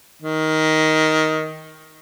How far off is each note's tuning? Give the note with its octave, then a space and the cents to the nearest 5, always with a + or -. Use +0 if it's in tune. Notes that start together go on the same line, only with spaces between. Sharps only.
D#3 +10